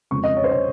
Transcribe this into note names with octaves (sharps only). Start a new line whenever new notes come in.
F2 C#3 G#3 C4 C#6
D#5
C#5
C5
C#5